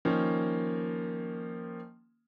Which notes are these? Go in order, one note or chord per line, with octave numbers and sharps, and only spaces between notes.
D#3 F3 A#3 C#4